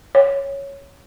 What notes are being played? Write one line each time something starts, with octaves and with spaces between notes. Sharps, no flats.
C#5